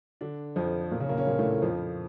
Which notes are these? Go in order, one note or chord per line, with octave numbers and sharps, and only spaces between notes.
D3 D4
F2 F3
A#2 A#3
C#3 C#4
A#2 A#3
C#3 C#4
A#2 A#3
A2 A3
F2 F3